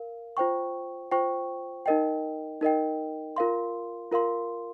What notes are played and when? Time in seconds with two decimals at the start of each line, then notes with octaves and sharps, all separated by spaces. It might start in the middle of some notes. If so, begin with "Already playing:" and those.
Already playing: A#4 F5
0.37 F4 C5 G5 C#6
1.11 F4 C5 G5 C#6
1.86 D#4 A#4 D#5 G5
2.61 D#4 A#4 D#5 G5
3.36 F4 A#4 F5 C6
4.12 F4 A#4 F5 C6